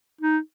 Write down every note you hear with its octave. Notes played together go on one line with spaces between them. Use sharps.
D#4